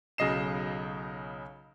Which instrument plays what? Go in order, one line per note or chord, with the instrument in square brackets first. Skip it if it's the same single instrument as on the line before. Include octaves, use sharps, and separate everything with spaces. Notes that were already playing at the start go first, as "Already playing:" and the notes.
[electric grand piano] B1 C#3 F#3 D#5 C7 E7